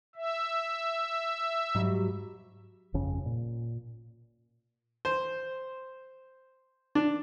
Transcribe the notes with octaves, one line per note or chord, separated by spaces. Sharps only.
E5
G#2 F#3 G3
G1 F2 C#3 C#4
A#2
C5
D4